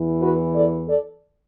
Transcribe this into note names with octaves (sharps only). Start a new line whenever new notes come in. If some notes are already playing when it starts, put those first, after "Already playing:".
Already playing: E2 E3
F#4 B4
A4 D5
A4 D5